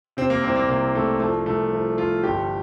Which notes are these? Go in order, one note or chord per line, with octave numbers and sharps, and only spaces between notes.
C3 C4
A#3
C2 C4
A#3
C2 A#3
C2 A3
F3 A3
C2 A3
F3
F3 F4
G1 G4